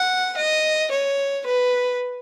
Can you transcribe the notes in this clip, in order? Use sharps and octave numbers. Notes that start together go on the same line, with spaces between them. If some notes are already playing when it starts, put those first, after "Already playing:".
Already playing: F#5
D#5
C#5
B4